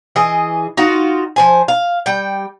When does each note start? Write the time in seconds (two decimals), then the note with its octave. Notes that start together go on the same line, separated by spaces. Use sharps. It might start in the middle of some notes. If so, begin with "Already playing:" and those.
0.16 E3 G#4 D#5
0.77 D#4 F4 F#4
1.36 F3 C5 G#5
1.68 F5
2.06 G3 G5